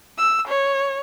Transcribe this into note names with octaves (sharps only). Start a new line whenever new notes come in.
E6
C#5